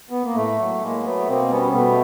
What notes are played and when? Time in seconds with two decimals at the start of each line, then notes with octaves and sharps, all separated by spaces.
0.10 B3
0.24 A#3
0.35 A2 A3
0.58 F#3
0.81 A2 G#3 A#3
1.03 F#3 A3 B3
1.27 B2 A#3 C4
1.50 G3 B3 C#4
1.72 B2 A3 B3